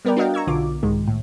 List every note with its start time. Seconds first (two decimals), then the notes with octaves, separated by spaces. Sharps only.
0.05 G3 B3 A#4 B4 D5 G5
0.17 D4 F#4 A#4 D#5 F5 G5
0.34 A#5 C#6 E6 G#6
0.47 B1 D3 F4 D6
0.83 C2 G#2 D#3 G#3
1.07 A2